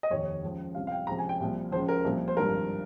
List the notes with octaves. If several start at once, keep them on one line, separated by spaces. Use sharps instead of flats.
D#5
F1 D#2 D#3 C#5
C#2 C#3 F3
C2 C3 F3 F5
F5
G5
C#2 C3 F3 A#5
G#5
G5
C2 A#2 F3
C#2 C#3 F3 C5
A#4
C2 A#2 F3
C5
G#1 G2 F3 A#4